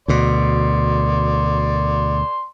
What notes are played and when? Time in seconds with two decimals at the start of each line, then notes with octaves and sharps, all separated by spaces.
0.08 D2 B2 D5 C6